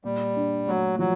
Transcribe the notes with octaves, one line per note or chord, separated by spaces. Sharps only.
A#2 G3
D4
F#3 A3
F3 F#3